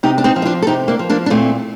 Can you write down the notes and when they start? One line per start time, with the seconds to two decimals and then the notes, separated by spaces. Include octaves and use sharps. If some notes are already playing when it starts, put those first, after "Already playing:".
0.03 C3 D#4 G4
0.18 D4
0.24 C4 D#4
0.36 F3
0.42 D#4
0.45 D4 F4
0.62 A4
0.67 C3 D#4 G4
0.88 A#3 D4
0.99 F3
1.10 A#3 D4
1.26 D4
1.30 A#2 A3 C4